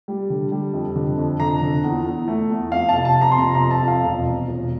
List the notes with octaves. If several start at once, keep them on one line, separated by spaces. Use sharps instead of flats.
G3
D3
G3
F2
D3
F2
D3 A#5
D3
E2
E2
A3
E2
F2 F5
A5
C3
A5
F2
A#5
C6
C3 A#5
F2 A#5
A5
F2
F5
E1
E1
E1